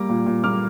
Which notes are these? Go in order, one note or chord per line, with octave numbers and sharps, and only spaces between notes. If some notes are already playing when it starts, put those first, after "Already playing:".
Already playing: G3 A#3 A#5 D6
A#2
A#2
A#3 D6 F6